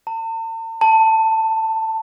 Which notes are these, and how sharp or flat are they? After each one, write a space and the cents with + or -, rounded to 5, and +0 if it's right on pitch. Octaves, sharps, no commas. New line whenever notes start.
A5 +45
A5 +15